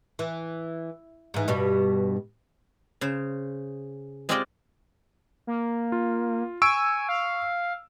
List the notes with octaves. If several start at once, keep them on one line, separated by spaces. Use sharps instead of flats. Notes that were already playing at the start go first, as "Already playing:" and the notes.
E3
G#2 E3
G2 B2 G3
C#3 C5
G#3 C4 F4 G4 D5 D#5
A#3
F4
G#5 C#6 E6 D7
F5